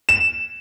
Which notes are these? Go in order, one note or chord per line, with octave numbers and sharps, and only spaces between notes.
E7